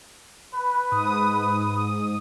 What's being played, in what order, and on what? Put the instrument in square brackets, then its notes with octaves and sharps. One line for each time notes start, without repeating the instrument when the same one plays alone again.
[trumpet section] B4
[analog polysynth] G#2 D#6